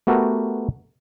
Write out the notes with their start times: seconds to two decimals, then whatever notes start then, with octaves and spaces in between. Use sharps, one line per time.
0.07 A3 B3 F#4 G4 A4 A#4